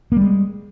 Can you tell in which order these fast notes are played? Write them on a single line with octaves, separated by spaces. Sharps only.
A#3 G3 G#3